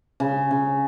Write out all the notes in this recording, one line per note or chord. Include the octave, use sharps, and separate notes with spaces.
C#3
C#3